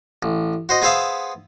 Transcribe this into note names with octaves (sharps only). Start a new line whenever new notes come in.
A1
F#4 C5 D#5
B3 G#4 C5 E5 F5 A5